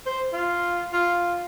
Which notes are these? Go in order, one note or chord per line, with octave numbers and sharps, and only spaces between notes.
C5
F4
F4